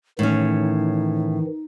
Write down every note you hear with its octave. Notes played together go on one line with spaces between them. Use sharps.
A2 D#3 E3 C#4 D#4